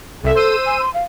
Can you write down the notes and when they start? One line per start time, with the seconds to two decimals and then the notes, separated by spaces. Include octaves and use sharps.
0.23 C2 A4 E5
0.35 C5 E6 D#7
0.66 G#5
0.80 C6
0.94 F5